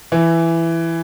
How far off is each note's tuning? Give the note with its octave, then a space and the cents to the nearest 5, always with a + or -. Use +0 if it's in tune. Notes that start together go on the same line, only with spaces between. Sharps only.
E3 +10